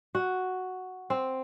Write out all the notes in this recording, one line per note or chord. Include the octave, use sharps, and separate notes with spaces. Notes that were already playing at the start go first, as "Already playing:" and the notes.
F#4
C4